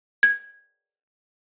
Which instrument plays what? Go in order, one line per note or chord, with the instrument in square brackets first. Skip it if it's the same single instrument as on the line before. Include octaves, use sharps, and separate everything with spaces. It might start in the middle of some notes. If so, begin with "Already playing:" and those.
[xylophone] G#6